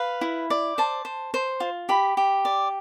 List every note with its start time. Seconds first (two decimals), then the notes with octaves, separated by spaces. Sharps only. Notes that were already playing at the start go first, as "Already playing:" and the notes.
Already playing: B4 F5
0.21 E4
0.50 D5
0.78 C5 A5
1.05 C5
1.34 C5
1.60 F4
1.89 G4 B5
2.17 G4
2.45 D5